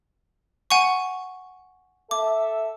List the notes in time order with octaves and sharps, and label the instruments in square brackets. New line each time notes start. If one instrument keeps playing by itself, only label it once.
[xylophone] F#5 G#5 C#6
[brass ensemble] A4 E5 [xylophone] D6